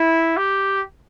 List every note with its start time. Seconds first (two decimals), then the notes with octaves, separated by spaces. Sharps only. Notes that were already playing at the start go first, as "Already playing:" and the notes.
Already playing: E4
0.37 G4